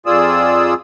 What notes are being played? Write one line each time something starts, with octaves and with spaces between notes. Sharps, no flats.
F2 F4 G#4 D5 D#6 E6